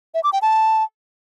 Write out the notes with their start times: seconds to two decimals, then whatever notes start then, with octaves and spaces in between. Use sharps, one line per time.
0.14 E5
0.24 D6
0.33 G5
0.42 A5